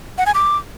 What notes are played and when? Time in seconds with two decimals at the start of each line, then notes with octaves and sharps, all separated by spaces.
0.18 F#5
0.26 G#5
0.34 D6